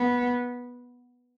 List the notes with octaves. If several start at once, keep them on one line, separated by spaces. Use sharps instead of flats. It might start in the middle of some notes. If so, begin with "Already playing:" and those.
Already playing: B3